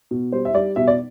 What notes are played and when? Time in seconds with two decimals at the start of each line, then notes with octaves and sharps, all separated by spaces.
0.11 B2
0.32 G3 C5
0.45 E5
0.54 G3 D5
0.76 B2 E5
0.87 D5